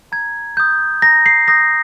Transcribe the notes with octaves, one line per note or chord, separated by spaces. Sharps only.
A#5 G#6
D#6 G6
A#5 A#6
C7
D#6 G6 A#6